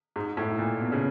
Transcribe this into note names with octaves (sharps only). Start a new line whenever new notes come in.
G#2
A2
A#2
B2
C#3